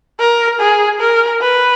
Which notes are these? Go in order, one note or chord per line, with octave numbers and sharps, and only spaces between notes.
A#4
G#4
A#4
B4